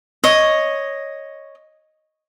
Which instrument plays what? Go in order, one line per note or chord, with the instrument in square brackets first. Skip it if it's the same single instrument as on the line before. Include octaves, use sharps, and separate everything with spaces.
[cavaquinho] C#5 D#5